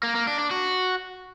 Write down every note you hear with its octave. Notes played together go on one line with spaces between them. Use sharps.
A#3
A#3
D4
D4
F#4